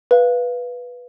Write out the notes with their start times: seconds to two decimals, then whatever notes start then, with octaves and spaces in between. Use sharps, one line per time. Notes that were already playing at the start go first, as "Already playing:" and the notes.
0.11 B4 F5